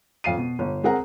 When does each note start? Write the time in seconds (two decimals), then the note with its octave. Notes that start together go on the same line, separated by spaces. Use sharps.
0.24 F2 F5 C7 D#7
0.37 B2
0.59 G1
0.84 C4 G#4 A#4 F#5 A#5